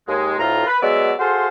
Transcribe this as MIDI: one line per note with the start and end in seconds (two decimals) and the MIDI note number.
0.07 0.36 39
0.07 0.36 56
0.37 0.64 38
0.37 0.64 45
0.37 0.64 57
0.37 0.64 65
0.37 0.64 82
0.66 0.76 71
0.81 1.12 54
0.81 1.12 56
0.81 1.12 59
0.81 1.12 74
0.81 1.12 76
1.19 1.48 66
1.19 1.48 68
1.19 1.48 69
1.19 1.48 72
1.19 1.48 77
1.19 1.48 84